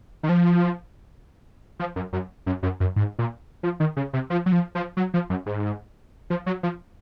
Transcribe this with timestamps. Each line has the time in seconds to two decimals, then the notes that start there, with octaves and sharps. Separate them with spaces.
0.23 D#3
0.29 F3
1.79 F3
1.96 F#2
2.13 F#2
2.46 F#2
2.63 F#2
2.80 F#2
2.96 G#2
3.19 A#2
3.63 F3
3.80 D#3
3.97 C#3
4.13 C3
4.30 F3
4.46 F#3
4.52 F3
4.75 F3
4.97 F#3
5.14 F3
5.30 F#2
5.46 G#2
6.30 F3
6.46 F#3
6.63 F3